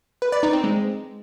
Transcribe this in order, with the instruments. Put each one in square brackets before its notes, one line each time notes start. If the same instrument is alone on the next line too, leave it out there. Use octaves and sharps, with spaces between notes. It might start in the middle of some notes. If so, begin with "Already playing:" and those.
[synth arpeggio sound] B4
D5
D#4
C4
G#3